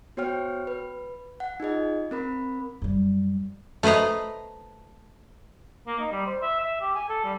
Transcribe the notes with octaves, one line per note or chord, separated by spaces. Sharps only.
B3 F#4 C5 C#5 G5 F6
B4
F#5
D#4 F4 G#4 D#5
C4 A#4 B5
F#2 G3
A3 B4 C5 D#5 A#5
A#3
D#4
G3
C5
E5
E5
G4
G#5
A4
G3